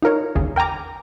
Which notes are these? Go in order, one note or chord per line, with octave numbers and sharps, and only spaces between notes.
D#4 F4 A#4 C#5
G1 D#2 C#3 G#4
A#4 G5 G#5 A#5 D6